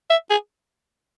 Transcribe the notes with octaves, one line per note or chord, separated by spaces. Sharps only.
E5
G#4